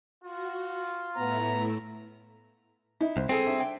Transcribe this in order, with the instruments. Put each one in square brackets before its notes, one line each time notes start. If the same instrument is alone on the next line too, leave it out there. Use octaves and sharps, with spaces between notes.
[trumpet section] F4 [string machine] F#4
[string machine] A2 A3 E4 [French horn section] B3 [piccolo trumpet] A#5
[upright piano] D#4 [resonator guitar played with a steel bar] E4
[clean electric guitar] C2 [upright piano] C5
[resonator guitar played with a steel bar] B2 G#4 A4 [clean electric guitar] C4
[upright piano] D4 E5
[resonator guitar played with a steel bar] G5